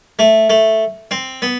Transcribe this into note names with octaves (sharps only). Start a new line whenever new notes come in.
A3
A3
C4
B3